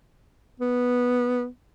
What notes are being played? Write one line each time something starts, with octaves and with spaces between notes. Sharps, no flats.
B3